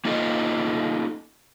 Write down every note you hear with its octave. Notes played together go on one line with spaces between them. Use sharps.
A#3 D#4 F4 A4 D#5